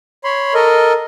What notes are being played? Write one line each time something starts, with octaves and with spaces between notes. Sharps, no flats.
C#5 B5 C6
A4 A#4 D#5